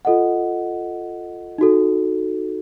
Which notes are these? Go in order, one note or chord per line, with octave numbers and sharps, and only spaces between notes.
F4 A4 D#5 F#5
D#4 F#4 A4